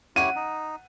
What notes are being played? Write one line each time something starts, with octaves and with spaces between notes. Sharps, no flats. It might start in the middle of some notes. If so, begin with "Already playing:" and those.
E4 G4 C#5 F#5 D#7
D#4